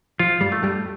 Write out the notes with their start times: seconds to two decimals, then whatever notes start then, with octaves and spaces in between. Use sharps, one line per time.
0.19 F3 F4
0.41 G2 G3
0.52 A3
0.63 G2 G3